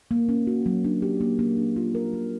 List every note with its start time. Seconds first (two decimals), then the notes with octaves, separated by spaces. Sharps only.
0.11 A#3
0.29 C#4
0.47 F#4
0.66 F#3
0.85 D4
1.02 G4
1.20 A#3
1.39 A#3
1.57 D4
1.76 F4
1.95 A#4
2.14 A#3